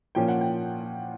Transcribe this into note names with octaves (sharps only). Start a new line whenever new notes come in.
A#2 F3 A#3 C#4 G5
F#5
G5